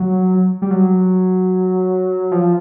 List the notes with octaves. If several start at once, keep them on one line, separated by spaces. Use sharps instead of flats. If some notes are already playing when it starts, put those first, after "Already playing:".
Already playing: F#3
G3
F#3
F3